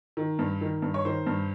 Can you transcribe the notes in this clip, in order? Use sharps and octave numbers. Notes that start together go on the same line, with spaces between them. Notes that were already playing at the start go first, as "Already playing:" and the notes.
D#3
G2
D#3
G2
C#5
D#3 C5
G2